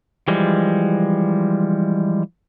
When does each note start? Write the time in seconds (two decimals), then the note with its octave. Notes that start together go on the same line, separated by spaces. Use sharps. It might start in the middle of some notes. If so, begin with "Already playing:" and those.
0.28 E3 F3 G3 G#3